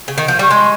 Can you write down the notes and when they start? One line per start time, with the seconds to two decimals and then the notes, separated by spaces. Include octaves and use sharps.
0.08 C#3
0.18 D#3
0.28 F3
0.39 G3 C#6
0.50 G#3 C6